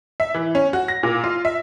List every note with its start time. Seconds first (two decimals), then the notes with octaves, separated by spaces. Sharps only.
0.20 E5
0.35 E3
0.55 C#4
0.73 F#4
0.88 A#6
1.03 A#2
1.24 F4
1.45 E5